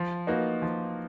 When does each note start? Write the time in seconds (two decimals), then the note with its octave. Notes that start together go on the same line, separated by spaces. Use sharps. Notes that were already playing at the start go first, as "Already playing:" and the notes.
Already playing: F3
0.27 A#3 D#4 F#4 B4
0.62 F3